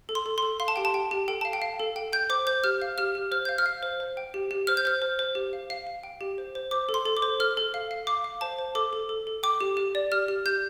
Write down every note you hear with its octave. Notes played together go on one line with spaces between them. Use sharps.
A4
C6
A4
C6
A4
F5 C6
A5
G4 G5
A5
G4 G5
G4
A4 G5
F5 A5
G5
F5
A4
G5
G5 G6
C5 D6
C5 G6
G4 F6
F5
G4 F6
G4
C5 F6
F5 G6
F6
F5
C5
C5
G5
G4
G4
C5 F6
G6
C5 F6
C5
C5
G4
F5
F5
F5
G5
G4
C5
C5
C5 D6
A4
C6
A4
D6
C5
A4 F6
A4
F5
F5
F5 D6
F5
C5 A5
C5
A4 D6
A4
A4
A4
G5 D6
G4
G4
D5
G4 F6
G4
G4 G6